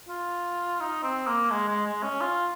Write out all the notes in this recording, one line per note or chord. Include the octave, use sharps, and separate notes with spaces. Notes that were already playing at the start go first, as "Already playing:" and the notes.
F4
D#4
C4
A#3
G#3
G#3
G#3
C#4
F4